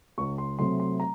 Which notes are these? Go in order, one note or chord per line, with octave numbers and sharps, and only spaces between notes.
C#2 C#6
C6
C3 F#3 A3 C6
C6
A#5